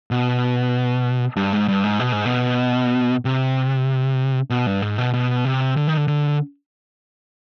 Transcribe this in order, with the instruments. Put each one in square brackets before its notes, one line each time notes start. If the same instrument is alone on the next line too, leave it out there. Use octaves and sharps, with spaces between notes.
[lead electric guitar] B2
G2
G#2
G2
G#2
B2
G#2
B2
C3
B2
G2
G#2
B2
B2
C3
D3
D#3
D3
D3